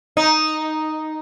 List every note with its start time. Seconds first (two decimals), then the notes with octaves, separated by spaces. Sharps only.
0.17 D#4